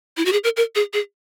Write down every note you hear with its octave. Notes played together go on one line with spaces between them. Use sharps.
E4
F#4
G#4
A#4
A#4
G#4
G#4